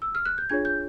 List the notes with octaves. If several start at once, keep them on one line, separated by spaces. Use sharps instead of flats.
E6
F6
F#6
G6
D4 F4 G#4 C#5 G#6
G6